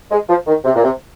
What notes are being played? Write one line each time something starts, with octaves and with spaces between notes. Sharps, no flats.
G#3
F3
D#3
C3
A#2
C3